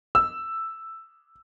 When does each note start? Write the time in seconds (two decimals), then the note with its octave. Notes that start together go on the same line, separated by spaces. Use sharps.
0.15 E6